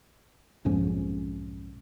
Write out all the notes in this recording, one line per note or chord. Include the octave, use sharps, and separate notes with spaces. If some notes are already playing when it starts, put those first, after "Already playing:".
B1 F2 G#2 C#4